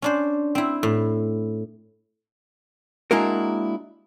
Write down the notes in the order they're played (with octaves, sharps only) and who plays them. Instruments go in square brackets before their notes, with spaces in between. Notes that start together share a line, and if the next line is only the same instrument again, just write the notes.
[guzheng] C#4 D4 C5
C4 E4
A2
[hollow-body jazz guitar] G#3 A#3 D4 E4 F#4 A#4